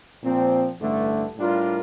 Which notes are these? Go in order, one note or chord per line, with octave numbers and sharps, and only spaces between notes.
A#2 F3 C4
A1 G2 D3 A3
A2 G3 D4 F4 A#4